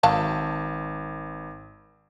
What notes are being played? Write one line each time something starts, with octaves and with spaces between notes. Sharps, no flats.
G#1 F#3 F5 A5